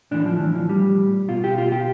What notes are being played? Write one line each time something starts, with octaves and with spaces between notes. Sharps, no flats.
A2 E3 D4
F3
E3
F3
G3
B2 F4
G4
F4
G4